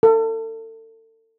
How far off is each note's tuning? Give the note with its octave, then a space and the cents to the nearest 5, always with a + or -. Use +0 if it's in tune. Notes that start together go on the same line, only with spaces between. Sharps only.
A4 +30